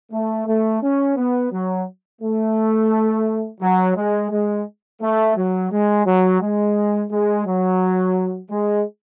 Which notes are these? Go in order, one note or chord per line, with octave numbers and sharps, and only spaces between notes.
A3
A3
C#4
B3
F#3
A3
F#3
G#3
G#3
A3
F#3
G#3
F#3
G#3
G#3
F#3
G#3